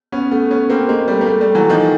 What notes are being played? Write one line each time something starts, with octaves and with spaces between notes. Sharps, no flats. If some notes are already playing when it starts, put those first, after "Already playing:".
B3 C#4
A3 B3
B3 C#4
A#3 C4
G#3 A#3
G3 A3
A#3
G3 A3
G3 A3
E3 F#3
D#3 F3